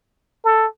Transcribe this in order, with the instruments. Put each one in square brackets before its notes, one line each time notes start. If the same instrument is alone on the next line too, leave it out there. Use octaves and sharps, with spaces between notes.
[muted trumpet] A4